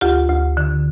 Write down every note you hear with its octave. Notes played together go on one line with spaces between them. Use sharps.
D2 F4 G4
D2
D3